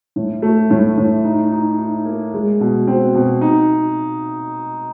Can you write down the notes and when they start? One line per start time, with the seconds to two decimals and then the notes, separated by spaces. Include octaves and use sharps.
0.16 A2
0.42 A3
0.70 A2
0.98 A2
1.24 D#4
1.51 D#4
1.79 D#4
2.05 A#3
2.34 G#3
2.61 B2
2.87 C4
3.15 B2
3.41 D#4